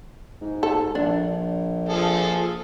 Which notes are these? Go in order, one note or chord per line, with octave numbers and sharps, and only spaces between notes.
G#2
A4
A#1 D4
F3 G#4 A4